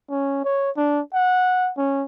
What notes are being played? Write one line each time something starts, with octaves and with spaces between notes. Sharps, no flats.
C#4
C#5
D4
F#5
C#4